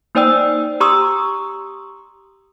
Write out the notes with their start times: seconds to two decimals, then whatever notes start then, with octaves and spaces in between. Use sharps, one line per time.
0.15 A#3 D#4 C5 D5 G5 E6
0.80 G4 A#5 C6 C#6 D#6 E6